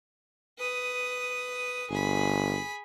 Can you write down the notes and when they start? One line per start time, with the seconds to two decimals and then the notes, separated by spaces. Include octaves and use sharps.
0.58 B4 D#6
1.90 G1 G#4 B5